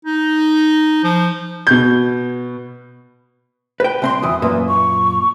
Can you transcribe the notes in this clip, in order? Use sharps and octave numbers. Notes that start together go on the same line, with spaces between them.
D#4
F3
B2 G6
B4 G5
C2 C4 C6
E2 E3 D#6
F#2 A#2 B4
C#6